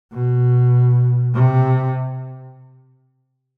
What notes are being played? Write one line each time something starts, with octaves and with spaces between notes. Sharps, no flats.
B2
C3